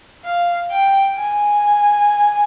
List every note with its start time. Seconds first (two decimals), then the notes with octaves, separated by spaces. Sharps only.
0.25 F5
0.71 G5
1.18 G#5